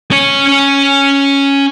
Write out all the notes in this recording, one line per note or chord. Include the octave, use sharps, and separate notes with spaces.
C#4 C#5